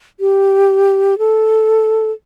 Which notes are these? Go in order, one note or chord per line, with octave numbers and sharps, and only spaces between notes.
G4
A4